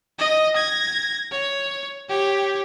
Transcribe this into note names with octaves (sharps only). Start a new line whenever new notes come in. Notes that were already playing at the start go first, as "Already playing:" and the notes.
D#5
G#6 A#6
C#5
G4 C#5